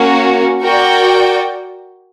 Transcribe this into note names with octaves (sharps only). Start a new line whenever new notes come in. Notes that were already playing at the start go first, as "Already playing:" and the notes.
Already playing: A#3 C#4 F#4 A#4
F#4 A#4 D5 G5